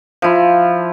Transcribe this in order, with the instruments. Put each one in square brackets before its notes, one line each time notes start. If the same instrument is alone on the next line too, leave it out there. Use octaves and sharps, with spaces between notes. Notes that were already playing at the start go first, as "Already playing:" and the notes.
[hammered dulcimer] F3 E4